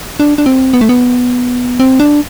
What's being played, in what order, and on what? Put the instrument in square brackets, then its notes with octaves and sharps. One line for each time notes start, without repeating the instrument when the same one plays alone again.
[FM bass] D4
D4
C4
B3
A3
B3
C4
D4